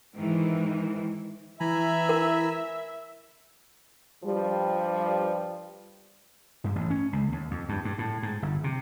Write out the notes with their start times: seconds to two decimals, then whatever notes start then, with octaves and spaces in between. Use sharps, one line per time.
0.14 G#2 D#3 E3
1.60 E3 E5 G#5 A#5 B5
2.09 A#4
4.24 G2 F3 G3
6.64 G2
6.76 A1
6.90 C#4
7.13 C#2
7.32 D#2
7.51 F2
7.69 G2
7.85 G2
7.98 A2
8.23 G#2
8.42 G1
8.64 C3